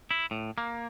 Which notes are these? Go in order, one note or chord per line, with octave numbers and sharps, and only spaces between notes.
E4
A2
A#3